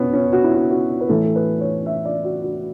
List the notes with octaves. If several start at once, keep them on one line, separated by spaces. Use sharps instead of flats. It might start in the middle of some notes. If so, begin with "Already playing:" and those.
Already playing: B2 B3 C#4
C#4
F#4
E4
F#4
F#4
B4
A2 E3 A4
A4
B4
C#5
E5
D5
F#4
F#4